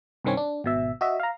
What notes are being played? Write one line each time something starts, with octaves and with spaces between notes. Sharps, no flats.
C2 G2 D#3 C4 C#4 C#5
D4
G#1 B2 E5
F#4 D#5 E5
F5 A#5